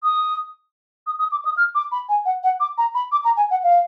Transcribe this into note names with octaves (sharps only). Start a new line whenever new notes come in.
D#6
D#6
D#6
D6
D#6
F6
D6
B5
G#5
F#5
F#5
D6
A#5
B5
D6
A#5
G#5
F#5
F5